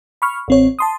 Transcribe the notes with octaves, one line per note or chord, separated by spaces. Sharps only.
B5 C#6 F6
A1 C4 C#5
A5 C6 D#6